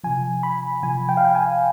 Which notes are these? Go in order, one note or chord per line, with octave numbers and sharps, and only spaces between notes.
C3 F3 G#5
B5
C3 F3 G#5
G5
F5
G5
G#5